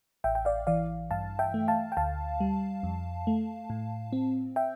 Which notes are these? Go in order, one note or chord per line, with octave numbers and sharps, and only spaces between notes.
A1 E5 G5
G5
D5 F5
E3 D5 F5
G2 F5 A5
E5 G5
A3
F5 A5
G5
D2 F5 A5
G3
F2
A3
A2
C4
E5 G5